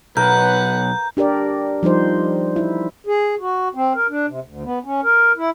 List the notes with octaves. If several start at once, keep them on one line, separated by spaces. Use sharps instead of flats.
B1 A#4 B4 F#5 G6
D4 G4 A#4 D5
F3 G3 D#4 C5
E4
G#4
F#4
C4
A#4
D4
C3
D2
B3
C#4
A#4
E4